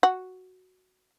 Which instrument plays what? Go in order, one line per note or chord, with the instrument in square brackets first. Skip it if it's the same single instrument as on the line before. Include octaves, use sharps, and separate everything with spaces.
[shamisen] F#4